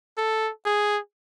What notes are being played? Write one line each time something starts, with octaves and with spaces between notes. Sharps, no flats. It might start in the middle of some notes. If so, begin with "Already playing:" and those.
A4
G#4